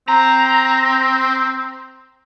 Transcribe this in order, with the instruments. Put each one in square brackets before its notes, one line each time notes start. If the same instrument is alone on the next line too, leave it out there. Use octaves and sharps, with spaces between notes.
[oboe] C4 [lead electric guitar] A#5